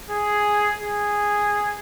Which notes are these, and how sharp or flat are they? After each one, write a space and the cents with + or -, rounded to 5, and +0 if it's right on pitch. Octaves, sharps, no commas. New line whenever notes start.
G#4 +0
G#4 -5